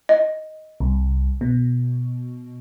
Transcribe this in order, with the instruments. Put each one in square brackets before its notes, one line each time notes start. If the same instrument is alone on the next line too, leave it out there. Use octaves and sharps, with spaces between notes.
[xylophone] D#5
[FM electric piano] C2
B2